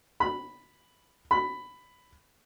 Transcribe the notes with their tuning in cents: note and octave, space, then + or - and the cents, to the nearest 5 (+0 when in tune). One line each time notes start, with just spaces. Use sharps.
B5 +0
B5 +10